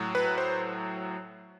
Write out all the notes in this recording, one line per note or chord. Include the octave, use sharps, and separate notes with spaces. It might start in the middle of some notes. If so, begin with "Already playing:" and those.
Already playing: A2 F#3
B4
C5